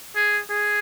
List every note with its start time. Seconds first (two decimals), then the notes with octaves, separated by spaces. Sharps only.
0.15 G#4
0.50 G#4